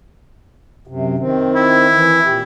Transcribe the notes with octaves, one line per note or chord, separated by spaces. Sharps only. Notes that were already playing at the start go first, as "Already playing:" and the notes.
F#2 C3
D#3 C4
E4
E3
A#2 G4